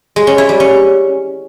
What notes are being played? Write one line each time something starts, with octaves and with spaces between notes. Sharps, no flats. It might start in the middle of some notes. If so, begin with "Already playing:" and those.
G#3
C#4
E4
G3
C#4